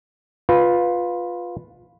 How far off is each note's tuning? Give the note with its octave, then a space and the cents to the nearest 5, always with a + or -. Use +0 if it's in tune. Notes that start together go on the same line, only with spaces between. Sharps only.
F4 +15 B4 +0